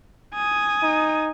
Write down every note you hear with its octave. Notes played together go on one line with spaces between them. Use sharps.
G#5 D#6
D#4